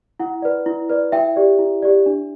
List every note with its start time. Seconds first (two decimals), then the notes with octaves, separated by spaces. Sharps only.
0.20 E4 F#5
0.42 B4 D5
0.66 E4
0.90 B4 D5
1.12 E4 E5 G5
1.36 G4 D5
1.59 E4
1.82 G4 D5
2.06 D4